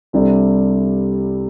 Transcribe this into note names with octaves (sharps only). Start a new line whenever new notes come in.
C2 C3 G3 D4 A4